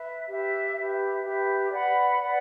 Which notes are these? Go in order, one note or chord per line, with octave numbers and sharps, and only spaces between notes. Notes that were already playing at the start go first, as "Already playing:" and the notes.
Already playing: B4 E5
G4 B4 E5
G4 B4 E5
G4 B4 E5
B4 D5 F#5 B5
B4 D5 F#5 B5